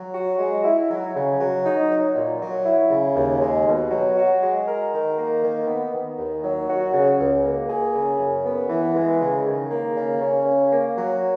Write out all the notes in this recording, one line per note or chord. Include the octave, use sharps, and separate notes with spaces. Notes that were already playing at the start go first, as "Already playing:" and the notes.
Already playing: F#3
F#4
G#3
E4
F#3
C#3
F#3
D#4
F#3
A#2
F#3
E4
C#3
D#2
G#3
B2
F#3
F#4
G#3
A#4
D#3
A#3
D#3
B3
D#3
D#2
F#3
F#4
C#3
C#2
A#3
G#4
C#3
F#2
B3
E3
G#3
C#3
D#3
A#3
C#3
C#4
C#3
A#3
F#3